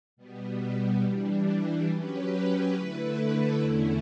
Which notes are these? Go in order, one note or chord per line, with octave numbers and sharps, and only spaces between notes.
B2 G3 B3
E3 G3 D4
F#3 C#4 G4 B4
D3 A3 E4 B4
E2 D3 A3 C#4 E4